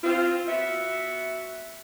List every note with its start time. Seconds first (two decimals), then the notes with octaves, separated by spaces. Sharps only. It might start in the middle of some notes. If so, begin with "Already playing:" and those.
0.03 C4 F4
0.48 B3 F#4 E5